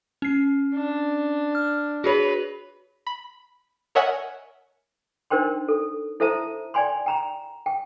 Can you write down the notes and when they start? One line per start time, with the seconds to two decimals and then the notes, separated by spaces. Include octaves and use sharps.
0.22 C#4 C7
0.74 D4
1.55 F6
2.04 F#4 G#4 B4 C#5
3.07 B5
3.95 A#4 C#5 D#5 E5 F#5 G#5
5.30 D4 D#4 A#4 C5 G5 C6
5.68 A4
6.20 E4 A4 C5 E5 A5 A#5
6.74 D5 G5 G#5 B5 C6
7.06 G5 A#5 B5
7.66 G5